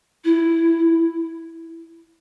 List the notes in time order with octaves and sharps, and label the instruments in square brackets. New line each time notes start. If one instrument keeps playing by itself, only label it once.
[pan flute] E4